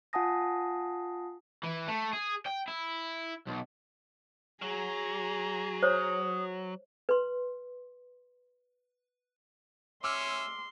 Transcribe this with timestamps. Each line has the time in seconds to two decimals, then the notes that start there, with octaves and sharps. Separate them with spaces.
0.13 F4 F#5 G#5 A5 D#6 A#6
1.63 E3
1.87 A3
2.13 G#4
2.46 G5
2.68 E4
3.47 B1
4.62 F#3 G#4 A#5
5.83 C5 C#5 D#6
7.09 B4 C6
10.04 C#4 E5 C6 D6 E6 F6